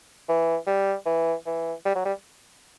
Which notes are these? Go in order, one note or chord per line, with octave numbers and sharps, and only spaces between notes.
E3
G3
E3
E3
G3
F#3
G3